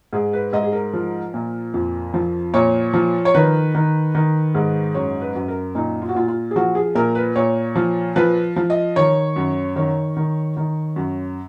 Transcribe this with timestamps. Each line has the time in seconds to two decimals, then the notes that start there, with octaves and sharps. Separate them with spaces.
0.13 G#2 G#4
0.33 B4
0.53 G#2 D#5
0.63 G#4
0.73 A#4
0.93 F3
1.34 A#2
1.74 F2
2.14 F3
2.54 A#2 C#5
2.94 F3
3.25 C#5
3.34 D#3 B4
3.75 D#3
4.15 D#3
4.55 G#2
4.94 F#2 C#5
5.21 B4
5.35 F#2
5.48 A#4
5.75 A#2 D#4
6.02 F4
6.09 F#4
6.15 A#2 F4
6.28 F4
6.51 G#4
6.56 F3 F#4
6.75 G#4
6.95 A#2 A#4
7.15 B4
7.36 A#2 C#5
7.76 F3
8.16 F3 B4
8.56 F3
8.70 D#5
8.96 D#3 C#5
9.36 F#2
9.76 D#3 C#5
10.17 D#3
10.57 D#3
10.96 F#2